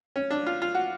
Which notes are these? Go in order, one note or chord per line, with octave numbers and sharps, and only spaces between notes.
C#4
D4
F4
F4
F#4